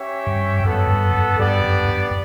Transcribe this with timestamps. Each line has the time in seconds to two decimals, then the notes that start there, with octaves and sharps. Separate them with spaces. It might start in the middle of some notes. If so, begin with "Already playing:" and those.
Already playing: C#4 G4 C#5 E5 G5
0.27 G2
0.64 F#2 B3 F#4 A4
0.89 G2
1.13 F#2
1.39 G2 B3 D4 G4 D5
1.64 F#2
1.89 F#2